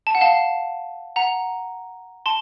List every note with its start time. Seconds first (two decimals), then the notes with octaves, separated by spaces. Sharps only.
0.07 A5
0.15 F#5
0.21 F5 A5
1.16 F#5 A#5
2.26 A5 C6